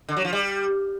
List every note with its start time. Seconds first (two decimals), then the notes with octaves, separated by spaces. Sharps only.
0.09 D3
0.17 F#3
0.25 F3
0.33 G3